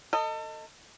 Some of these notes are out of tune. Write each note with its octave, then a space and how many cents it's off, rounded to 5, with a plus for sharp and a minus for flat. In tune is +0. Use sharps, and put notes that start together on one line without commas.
A4 +35 D#5 +0